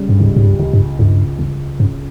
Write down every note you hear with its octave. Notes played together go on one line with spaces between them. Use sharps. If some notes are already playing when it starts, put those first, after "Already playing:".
Already playing: C#3 G3
G2
C#2 G#2
G#2
G2
C#2
G2
C#2 G2
C#2
G2 C#3